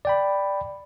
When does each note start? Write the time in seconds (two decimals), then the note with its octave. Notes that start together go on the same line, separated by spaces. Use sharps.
0.05 D5 G5 B5